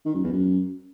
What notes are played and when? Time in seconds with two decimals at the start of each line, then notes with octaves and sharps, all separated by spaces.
0.06 D#3
0.15 F#2
0.24 E2
0.33 F#2